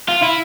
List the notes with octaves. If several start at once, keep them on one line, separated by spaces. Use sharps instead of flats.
F4
E4